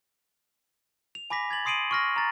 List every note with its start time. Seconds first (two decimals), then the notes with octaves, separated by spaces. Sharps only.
1.15 F7
1.30 G#5 B5 D6 A#6 B6
1.50 G#6 A6 F#7
1.65 C6 D#6 C7 D7 D#7 F#7
1.91 C#6 F6 A#6
2.16 A#5 A6